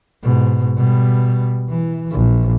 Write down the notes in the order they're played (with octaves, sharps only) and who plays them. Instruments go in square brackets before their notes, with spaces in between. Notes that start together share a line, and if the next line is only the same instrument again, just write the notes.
[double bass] G#2 B2
B2 G3
E3
A#1